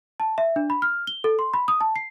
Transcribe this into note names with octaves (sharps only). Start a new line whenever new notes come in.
A5
E5
D4
B5
F6
G7
A4
C6
B5
D#6
A5
C7